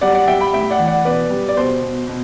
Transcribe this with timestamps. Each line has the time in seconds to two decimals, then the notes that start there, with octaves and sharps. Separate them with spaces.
0.01 G3 D5 F#5
0.14 D5 F#5
0.27 G3 E5 G5
0.40 G5 B5
0.53 A2 E5 G5
0.70 D5 F#5
0.79 E3
0.87 D5 F#5
1.04 B2 B4 D5
1.30 G3
1.49 D5
1.57 B2 C5
1.82 B2
2.07 B2